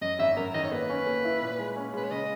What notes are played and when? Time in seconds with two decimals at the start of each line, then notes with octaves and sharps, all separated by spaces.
0.01 F#2 D#5
0.19 G#1 E5
0.37 F#2 A#4
0.54 D#3 D#5
0.64 C#5
0.72 A#3 B4
0.90 C#4
1.06 A#3
1.25 E4
1.42 A#2
1.59 G#3
1.76 C#4
1.94 G#3 B4
2.04 C#5
2.11 C#3 D#5